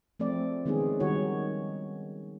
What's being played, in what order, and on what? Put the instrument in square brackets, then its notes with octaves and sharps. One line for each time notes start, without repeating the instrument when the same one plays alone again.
[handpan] F3 A3 C4 D5
D#3 G#3 B3 C#4 G#4
D#3 G3 D#4 F#4 C#5